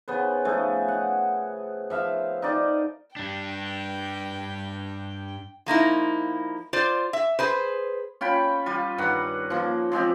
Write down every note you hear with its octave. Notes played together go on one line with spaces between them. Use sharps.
C#3 B3 C5
F3 A3 G#4
F#5
F3 E5 F5
D#4 C5 D5 G5
G2 D4 G5
F3 A#3 D#4 E4
F4 C5 D5
E5
G#4 B4 C5
C#4 F4 G5 B5
G3 F4
G2 D#3 F#5
F3 A#3
F3 G#3 C4 G4